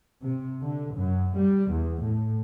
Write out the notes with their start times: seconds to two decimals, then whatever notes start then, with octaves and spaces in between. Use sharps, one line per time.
0.21 C3
0.61 D3
0.95 F#2
1.37 G3
1.71 E2
2.02 A2